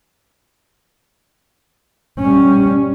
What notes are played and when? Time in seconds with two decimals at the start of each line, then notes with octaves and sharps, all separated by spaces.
2.19 G3 C#4